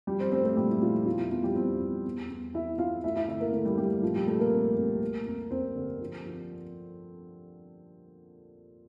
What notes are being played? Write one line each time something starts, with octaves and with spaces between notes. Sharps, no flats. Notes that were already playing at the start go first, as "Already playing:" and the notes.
F3 G3 G4
C4 C5
A3 C4 C5
A3 A4
A#2 G3 G4
E4
F3 A3 F4
E2 F3 F4
E4
E2 F3 F4
G3 G4
E2 C4 C5
E2
E2
E2
E3 E4 E5
E3 F4 F5
A3 E4 E5
E4 E5
D3 E4 E5
A#3 A#4
D3 A3 A4
G3 G4
G3 A3 G4
A#2 F3 F4
G3 G4
A3 A4
A#3 A#4
C2
C2
A#3
F2
F2 C4 C5
D3
F3
F3